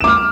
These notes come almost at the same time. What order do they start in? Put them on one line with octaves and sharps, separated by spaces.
E7 D6 F6